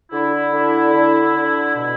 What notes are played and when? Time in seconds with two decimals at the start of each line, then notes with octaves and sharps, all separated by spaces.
0.11 D3 E4
0.52 D3
0.94 D3
1.35 D3
1.75 B2 E4